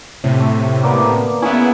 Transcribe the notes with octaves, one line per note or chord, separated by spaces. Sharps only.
A2 C3
A3
D3 A#3 B3
B3 C#4 E4 G#4